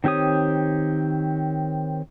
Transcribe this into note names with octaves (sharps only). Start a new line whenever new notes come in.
D#3 C4 G4 C#5 D#6